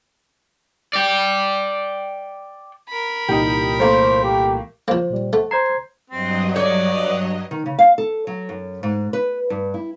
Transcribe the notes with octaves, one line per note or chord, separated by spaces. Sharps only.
D5 G5
A#4 B5
C2 A#2 E3 D#4 G4
A3 A#3 C5
G4
F3 A#3 C5
A#2 G3
A3 F#5
C5 A#5 G#6 C7
G2 F#3 C4 D#5
C#5 D5
D#3
C#3
F5
A4
F#3
F#2
G#2
B4
G2
E4